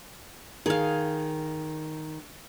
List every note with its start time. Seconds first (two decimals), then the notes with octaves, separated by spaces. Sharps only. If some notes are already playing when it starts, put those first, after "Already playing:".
0.66 D#3 G#4 F5